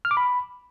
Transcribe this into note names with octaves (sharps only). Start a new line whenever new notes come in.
F6
D6
B5